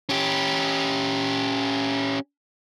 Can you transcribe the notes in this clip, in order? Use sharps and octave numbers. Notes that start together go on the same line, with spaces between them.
C#4 G4